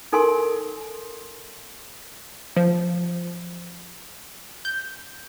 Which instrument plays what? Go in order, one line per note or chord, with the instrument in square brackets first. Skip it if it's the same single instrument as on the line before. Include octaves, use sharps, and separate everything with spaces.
[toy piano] D#4 A4 A#4 G#5 C6
[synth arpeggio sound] F3
G6